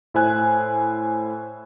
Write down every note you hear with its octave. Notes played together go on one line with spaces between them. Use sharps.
A2 E4 C5 G#5 F#6